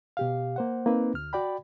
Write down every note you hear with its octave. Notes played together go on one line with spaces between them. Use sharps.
B2 G4 F5
A#3 C5 F#5
A#3 C4 D#4 B4
D2 F6
F#4 D5 G5 B5